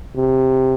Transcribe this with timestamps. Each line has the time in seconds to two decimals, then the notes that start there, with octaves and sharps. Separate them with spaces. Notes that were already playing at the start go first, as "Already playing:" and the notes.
0.17 C3